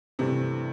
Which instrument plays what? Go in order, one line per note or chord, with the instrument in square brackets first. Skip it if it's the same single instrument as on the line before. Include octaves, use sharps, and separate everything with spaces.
[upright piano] G2 E3 A3 [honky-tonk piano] C3